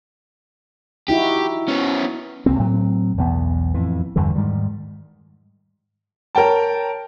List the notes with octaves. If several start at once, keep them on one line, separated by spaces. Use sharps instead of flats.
D#4 E4 F#4 G4
B3 C#4
C2 A#3 C4
A2 F#3 C4
B1 E2 B3
F2 A2 E3
E2 G2 D3 E3
G#2 D#3 G3
A#4 C#5 G5 A5